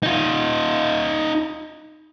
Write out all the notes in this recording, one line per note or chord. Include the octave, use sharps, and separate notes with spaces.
D#4 F4